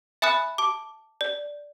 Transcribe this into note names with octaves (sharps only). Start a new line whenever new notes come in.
E5 G#5 B5 D#6 F#6
A5 D6
D5